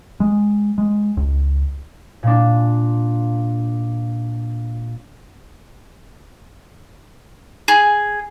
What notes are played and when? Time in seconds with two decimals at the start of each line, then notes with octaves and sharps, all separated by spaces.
0.20 G#3
0.78 G#3
1.17 C#2
2.23 A#2 D4
7.68 G#4